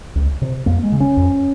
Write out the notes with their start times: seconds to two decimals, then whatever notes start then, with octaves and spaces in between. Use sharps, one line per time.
0.15 C#2
0.42 C3
0.66 F2 A#3
0.83 G#3
0.92 C#3
1.00 C#4
1.17 F2